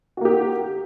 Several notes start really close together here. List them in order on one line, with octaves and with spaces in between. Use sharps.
F#4 A#3 G4